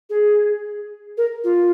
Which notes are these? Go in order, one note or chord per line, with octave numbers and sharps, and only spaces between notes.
G#4
A#4
F4